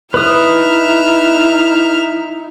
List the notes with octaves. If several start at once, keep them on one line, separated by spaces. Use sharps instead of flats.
D#4 E4 B4 E5 D#6 F6